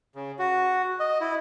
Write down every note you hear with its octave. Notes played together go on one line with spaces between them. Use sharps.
C#3
F#4
D#5
E4